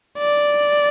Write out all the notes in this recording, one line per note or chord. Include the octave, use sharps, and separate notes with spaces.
D5